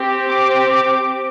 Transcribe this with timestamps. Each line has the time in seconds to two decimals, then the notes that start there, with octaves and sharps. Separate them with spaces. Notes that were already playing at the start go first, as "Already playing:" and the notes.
Already playing: C4 G4
0.29 D6
0.65 D6